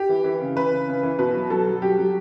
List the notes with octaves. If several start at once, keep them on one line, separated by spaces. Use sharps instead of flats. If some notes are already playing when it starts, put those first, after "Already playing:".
Already playing: G4
E3
E3
C#3
E3 B4
C#3
C#3
E3
B2 B4
F#3
F#3 A4
F#3
F#3 G4
F#3